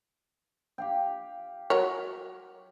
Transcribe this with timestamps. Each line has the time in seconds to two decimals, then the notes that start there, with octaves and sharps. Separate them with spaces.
0.78 G4 F5 G5
1.70 F#3 A#4 C#5